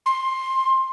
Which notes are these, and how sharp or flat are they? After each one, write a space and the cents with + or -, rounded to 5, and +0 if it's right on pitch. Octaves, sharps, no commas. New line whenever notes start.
C6 +15